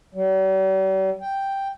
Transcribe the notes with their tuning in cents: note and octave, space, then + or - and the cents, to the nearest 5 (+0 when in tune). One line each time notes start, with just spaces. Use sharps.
G3 -45
G5 +0